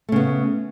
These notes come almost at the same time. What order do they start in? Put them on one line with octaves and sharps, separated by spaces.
A3 C#3 B3